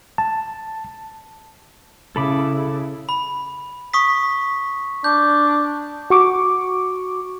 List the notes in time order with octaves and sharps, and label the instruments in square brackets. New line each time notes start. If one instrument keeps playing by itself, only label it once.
[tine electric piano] A5
[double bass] C#3 E4 [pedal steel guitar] A4 B5 D6
[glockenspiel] B5
C#6 D#6 B6
[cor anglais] D4 [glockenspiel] G6
[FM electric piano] F#4 C#6 D6